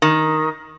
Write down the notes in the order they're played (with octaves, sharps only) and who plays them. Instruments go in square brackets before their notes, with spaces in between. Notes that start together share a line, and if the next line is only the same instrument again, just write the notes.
[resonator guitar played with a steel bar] D#3